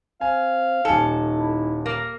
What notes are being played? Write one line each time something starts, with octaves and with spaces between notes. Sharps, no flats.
C4 F5 G#5
D#1 D#4 A4 G#5 C#7
E4
A#3 A#4